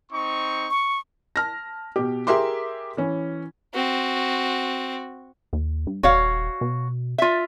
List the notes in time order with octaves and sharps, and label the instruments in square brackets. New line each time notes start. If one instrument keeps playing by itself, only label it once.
[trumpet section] C4 D#4 C#6
[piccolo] C#6
[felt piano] A5 F6 A#6
B2 G4
G4 G#4 A#4 E5 C6 D6
E3 C#4
[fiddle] C4 [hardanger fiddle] F#4
[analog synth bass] D#2
G2
[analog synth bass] D#1 [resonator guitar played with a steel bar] F#4 C#5 F5
[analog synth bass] B2
[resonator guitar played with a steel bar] F4 E5